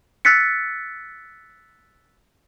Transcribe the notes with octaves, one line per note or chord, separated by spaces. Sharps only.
E6 F#6 A6 B6 C#7